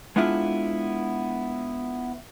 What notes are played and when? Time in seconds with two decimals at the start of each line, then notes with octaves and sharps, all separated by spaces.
0.16 G#3 B3 D4 E4 F4